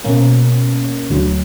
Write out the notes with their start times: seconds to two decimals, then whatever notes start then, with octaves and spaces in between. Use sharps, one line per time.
0.04 B2 A#3 C#4
1.10 D2 D3 F#3